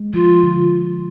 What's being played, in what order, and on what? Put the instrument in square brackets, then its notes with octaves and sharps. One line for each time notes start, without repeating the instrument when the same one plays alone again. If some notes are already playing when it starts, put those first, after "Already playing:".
Already playing: [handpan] G#3
[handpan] F3 [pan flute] F4
[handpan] D3